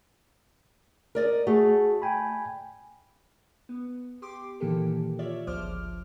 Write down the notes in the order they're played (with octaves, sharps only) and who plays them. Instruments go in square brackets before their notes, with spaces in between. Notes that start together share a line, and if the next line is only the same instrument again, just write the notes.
[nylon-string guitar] A#4 D5 D#5
[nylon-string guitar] A3 [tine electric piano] F#4 G#4
[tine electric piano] G5 G#5 B5
[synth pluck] B3
G4 C6 D6
A#2 D#3 E3 A#3 G4 A4
F4 C#5 D5 E5
G1 C#2 F3 C5 D6 F6